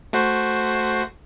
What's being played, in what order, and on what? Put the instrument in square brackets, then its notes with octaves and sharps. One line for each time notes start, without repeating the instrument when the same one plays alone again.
[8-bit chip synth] A3 F#4 C5